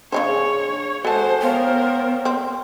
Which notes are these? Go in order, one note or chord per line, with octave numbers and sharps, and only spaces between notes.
C#3 G#3 D4 G#4 C5 C#5
G#3 F#4 A4 C5 F#5 G#5 A5
B3 A#4 C5 C#5 F5 G5
C4